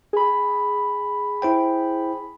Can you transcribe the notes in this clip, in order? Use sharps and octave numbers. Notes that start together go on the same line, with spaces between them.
G#4 B5
E4 C5 G5